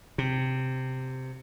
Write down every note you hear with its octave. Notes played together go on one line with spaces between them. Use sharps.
C3